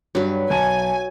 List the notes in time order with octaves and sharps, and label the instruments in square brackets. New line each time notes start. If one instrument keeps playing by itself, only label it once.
[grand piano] G2 [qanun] F#3 B4
[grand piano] B1 A5 D#7 [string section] G#5